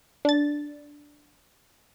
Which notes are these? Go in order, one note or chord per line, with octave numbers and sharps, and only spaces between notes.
D4 A6